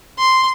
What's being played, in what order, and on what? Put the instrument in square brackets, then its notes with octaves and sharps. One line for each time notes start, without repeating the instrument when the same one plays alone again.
[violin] C6